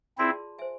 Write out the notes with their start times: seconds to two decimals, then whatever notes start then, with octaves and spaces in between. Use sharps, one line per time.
0.18 C4 E4 F4 G#4 D5 A5 C6
0.59 C5 E5 G#5